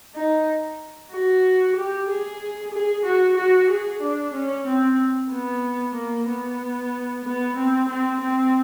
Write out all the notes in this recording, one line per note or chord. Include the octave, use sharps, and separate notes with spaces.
D#4
F#4
G4
G#4
G#4
F#4
F#4
G#4
D4
C#4
C4
B3
A#3
B3
B3
C4
C4
C4